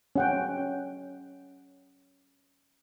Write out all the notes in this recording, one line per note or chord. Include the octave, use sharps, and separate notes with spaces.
C#4 F#5 G5